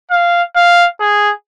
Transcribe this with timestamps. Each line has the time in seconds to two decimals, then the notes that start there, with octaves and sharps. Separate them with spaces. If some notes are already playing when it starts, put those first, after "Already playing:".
0.11 F5
0.55 F5
1.00 G#4